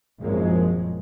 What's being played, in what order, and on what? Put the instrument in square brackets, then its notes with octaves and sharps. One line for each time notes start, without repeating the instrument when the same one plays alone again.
[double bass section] G#1 F#2 A#2 F3 G#3